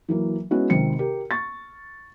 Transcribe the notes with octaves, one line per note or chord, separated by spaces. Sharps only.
E3 F#3 A#3
G#3 B3 C#4 E4 F#4
G#1 C3 D#3 C4 C#7
G4 A#4
C#6 A6